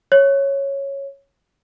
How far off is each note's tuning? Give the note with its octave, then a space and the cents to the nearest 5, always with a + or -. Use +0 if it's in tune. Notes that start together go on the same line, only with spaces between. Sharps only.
C#5 -5